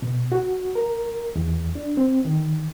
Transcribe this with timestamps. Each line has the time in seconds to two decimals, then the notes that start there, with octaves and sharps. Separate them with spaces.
0.02 B2
0.32 F#4
0.75 A#4
1.36 E2
1.75 D4
1.97 C4
2.25 D#3